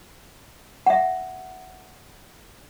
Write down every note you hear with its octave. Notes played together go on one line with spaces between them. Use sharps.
E5 F#5